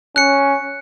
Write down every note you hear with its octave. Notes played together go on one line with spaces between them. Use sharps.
C#4 F#6 C#7